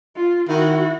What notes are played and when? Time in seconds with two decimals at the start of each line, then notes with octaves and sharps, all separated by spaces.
0.15 F4
0.49 D#3 E4 F#4